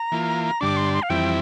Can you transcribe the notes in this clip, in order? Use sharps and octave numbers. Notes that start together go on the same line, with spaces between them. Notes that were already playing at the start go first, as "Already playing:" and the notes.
Already playing: A#5
E3 A#3 F4
G2 D3 G3 D4 D6
C6
C6
F5
F2 E3 G3 C4 E4 G5